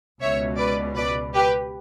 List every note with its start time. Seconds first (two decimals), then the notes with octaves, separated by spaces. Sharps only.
0.21 C#2 B2 C#5 E5
0.58 B4 D5
0.96 B4 D5
1.34 G4 B4